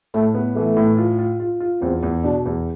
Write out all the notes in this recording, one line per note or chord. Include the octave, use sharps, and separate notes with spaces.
A2 A3
B3
E3 A3
A2
F4
F4
F4
F4
E2 C4
E2
B2 D4
E2